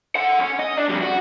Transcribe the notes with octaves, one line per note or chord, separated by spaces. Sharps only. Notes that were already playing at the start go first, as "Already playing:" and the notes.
A4 F#5
C#4
D#5
D4
F2 G3
F#4